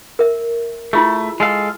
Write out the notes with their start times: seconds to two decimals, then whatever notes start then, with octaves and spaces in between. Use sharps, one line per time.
0.19 A#4 E5
0.93 A3 E4 F4 G#4
1.40 G#3 A4 F5